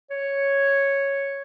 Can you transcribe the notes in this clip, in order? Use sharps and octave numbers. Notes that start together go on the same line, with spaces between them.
C#5